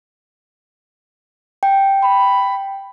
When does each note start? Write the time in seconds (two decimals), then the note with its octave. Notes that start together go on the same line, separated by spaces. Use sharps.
1.63 G5
2.03 B5